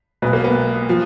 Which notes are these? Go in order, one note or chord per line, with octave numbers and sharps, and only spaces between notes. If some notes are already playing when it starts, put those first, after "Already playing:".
B1 B2 G#3 B3
A#3
B3
F3